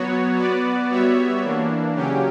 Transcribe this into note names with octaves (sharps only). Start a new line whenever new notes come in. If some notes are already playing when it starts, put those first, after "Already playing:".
Already playing: F#3 B3 F#4 C#5
B3 F#4 B4 D5
G3 B3 F#4 C#5 E5
E3 A#3 D4
C#3 F#3 C#4 G4